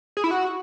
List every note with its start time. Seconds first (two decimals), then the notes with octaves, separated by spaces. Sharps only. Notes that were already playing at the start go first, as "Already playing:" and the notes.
0.17 G#4
0.24 E4
0.31 F#4